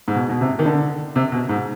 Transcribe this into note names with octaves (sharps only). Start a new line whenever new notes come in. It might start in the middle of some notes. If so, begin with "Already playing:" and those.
G#2
B2
B2
C3
D#3
D3
C3
B2
G#2